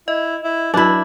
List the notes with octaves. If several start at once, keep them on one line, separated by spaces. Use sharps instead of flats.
E4 D#5
E4
E3 F#3 D4 E4 F#4